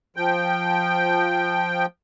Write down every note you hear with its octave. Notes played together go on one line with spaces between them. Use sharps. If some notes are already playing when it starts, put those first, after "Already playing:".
F3 G5